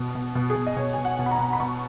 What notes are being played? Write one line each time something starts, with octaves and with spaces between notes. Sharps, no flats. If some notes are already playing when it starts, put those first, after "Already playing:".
Already playing: B2
B2
B2
G#4
B2
D#5
B2 C#5
B2 G#5
F#5
B2
B5
A#5
B2
B5
B2 C#6